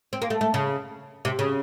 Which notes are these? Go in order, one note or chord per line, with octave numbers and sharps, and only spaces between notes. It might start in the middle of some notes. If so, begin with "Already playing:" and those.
C4
A#3
A3
A3
C#3
C3
C#3